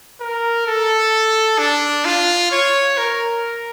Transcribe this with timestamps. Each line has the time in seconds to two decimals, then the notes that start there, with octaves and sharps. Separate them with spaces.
0.21 A#4
0.67 A4
1.59 D4
2.05 F4
2.51 C#5
2.97 A#4